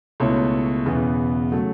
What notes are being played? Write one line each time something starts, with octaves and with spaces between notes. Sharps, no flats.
C#2 B2 A3 E4 C#5
E1 E2 C#3 E3 B3
C#3 F#3 A3